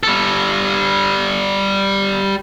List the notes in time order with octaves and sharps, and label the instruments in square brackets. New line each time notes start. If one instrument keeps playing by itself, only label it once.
[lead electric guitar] G3 A4